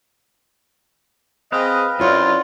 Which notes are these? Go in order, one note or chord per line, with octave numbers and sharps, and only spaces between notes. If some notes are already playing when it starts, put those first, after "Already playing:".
C4 G#4 B4 D#5 F5
F#2 C4 E4 F4 C#5 D5